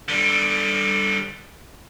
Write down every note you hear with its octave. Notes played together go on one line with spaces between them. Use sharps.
D3 G3